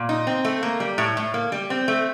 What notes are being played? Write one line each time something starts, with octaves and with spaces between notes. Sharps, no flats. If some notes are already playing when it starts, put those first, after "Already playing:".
Already playing: A#2
D#4
C4
A3
A#3
G3
A2
A2
A#3
G3
C4
A3